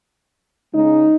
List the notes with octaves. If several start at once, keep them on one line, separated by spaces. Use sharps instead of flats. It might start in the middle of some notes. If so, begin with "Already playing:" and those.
C#3 G#3 D#4